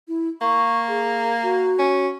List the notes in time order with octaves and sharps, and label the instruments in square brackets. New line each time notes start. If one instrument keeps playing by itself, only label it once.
[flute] E4
[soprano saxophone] A#3 [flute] C#6
[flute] G#4
F#4
[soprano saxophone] C#4